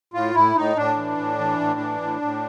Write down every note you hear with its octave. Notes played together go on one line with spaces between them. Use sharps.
A2 F4
A2 E4
A2 D#4
A2 D4
E3
A2
E3
A2
E3
A2
A2